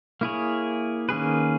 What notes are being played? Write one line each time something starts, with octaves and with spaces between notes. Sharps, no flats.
A#3 E4 G#4 C#5
D#3 A#3 C#4 G#4 B4